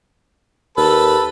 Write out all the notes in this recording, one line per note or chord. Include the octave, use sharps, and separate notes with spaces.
D#2 A4 B4